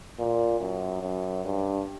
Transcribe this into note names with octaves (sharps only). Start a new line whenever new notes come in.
A#2
F#2
F#2
G2